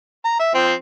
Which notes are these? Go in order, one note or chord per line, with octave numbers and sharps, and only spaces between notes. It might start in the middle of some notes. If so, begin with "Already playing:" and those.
A#5
E5
F3 C4 G5